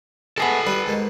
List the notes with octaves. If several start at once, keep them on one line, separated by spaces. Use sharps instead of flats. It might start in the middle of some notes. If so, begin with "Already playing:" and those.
G#3 A3 B3 A4 G#5
G3 F#4 B4
G#2 B2 A#3